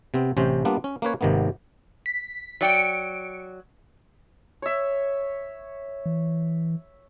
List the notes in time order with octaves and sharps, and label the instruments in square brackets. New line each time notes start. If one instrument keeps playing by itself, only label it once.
[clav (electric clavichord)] C3 B3 C4
A1 C3 C#4 C5
G3 A#3 B3 D4 F4
C#4
A#3 C#4 B4 C#5
G#1 C3 D#3 A#3 B3
[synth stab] B6
[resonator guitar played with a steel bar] F#3 D5 G5 [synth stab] C#7 D7
[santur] C#5 E5
[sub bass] E3